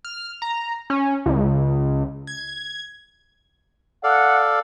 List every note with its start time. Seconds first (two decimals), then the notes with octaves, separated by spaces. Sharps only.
0.05 F6
0.42 A#5
0.90 C#4
1.26 C#2
2.27 G#6
4.04 A4 D5 F5 F#5